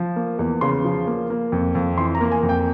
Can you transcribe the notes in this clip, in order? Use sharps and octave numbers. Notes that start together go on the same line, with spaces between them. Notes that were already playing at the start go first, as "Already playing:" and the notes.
Already playing: F3
A#3
E2
C#3 C6
F3
A#3
A#3
F2
F2
E3 C6
A#5
A#3
G#5
F2
G5